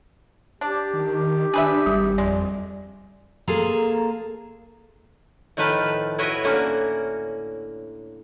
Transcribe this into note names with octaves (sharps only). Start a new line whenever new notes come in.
D4 G4
D#3
D4 G#4 B4 E5
G#1 G3
F2 G#3 D5
A#3 F4 G#4 A4 A#5
A2 D#3 F3 B4 A5
E4 F#4 B4 C#5 D#5 E5
A2 D3 A#3 C#4 F#4